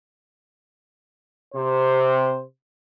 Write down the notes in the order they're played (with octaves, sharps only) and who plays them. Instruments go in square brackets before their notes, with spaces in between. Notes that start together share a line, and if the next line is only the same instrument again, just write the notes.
[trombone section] C3 C5